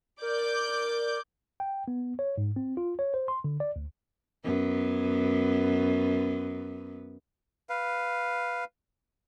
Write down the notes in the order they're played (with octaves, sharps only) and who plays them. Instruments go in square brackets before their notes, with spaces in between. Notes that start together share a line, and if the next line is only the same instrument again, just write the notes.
[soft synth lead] A#4 [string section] D5 D6 G6
[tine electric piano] G5
B3
C#5
G#2
C4
F4
C#5
C5
C6
D3
D5
D2
[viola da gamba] F#2 B3
[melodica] B4 F5